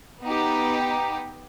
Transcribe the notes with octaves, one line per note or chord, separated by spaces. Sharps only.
B3 D#4 G4